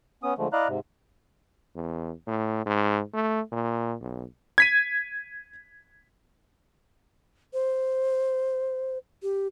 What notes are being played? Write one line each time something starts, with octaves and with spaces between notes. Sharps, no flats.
B3 C#4 D#6
D3 F3 G#3 A3
E4 D5 D#5 F5 A#5 F#6
G#2 C3
E2
A2
G#2
A3
A#2
B1
G#6 B6 D#7
C5
G4